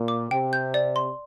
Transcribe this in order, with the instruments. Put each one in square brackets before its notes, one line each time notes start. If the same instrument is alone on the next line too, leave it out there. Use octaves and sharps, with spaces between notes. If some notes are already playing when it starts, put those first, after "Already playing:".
Already playing: [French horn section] A#2
[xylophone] D6
[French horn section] C3 [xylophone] G5
[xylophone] G6
D5
C6